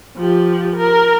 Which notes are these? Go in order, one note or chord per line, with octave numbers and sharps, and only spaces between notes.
F3 G4
A#4